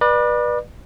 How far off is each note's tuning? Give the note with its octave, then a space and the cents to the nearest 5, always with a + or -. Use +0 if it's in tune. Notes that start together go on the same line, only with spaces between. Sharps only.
B4 -25 D5 +30